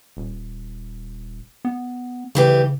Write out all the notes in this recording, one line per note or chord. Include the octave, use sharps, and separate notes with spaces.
D#1
B3
D2 C#3 E3 G4